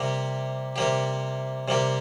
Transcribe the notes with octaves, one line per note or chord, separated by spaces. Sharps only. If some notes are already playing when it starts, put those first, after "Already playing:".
Already playing: C3 G3 A#3 G4
C3 G3 A#3 G4
C3 G3 A#3 G4